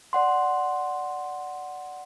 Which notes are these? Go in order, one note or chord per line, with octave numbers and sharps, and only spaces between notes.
D5 F#5 C6